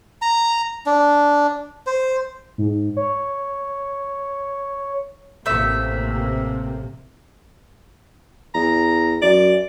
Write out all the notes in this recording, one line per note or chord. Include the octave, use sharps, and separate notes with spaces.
A#5
D4
C5
G#2
C#5
A1 C3 A3 A#3 E5
E2 A#5
F#2 D5